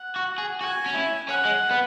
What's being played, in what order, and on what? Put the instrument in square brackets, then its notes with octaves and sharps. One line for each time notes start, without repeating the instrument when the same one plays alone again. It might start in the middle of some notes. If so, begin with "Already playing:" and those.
Already playing: [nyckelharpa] F#5
[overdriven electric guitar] F#4
G#4
[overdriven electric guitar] F#4 [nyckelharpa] G#5
[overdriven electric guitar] C#4
E4
[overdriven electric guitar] C#4 [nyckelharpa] F#5
[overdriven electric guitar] G#3
B3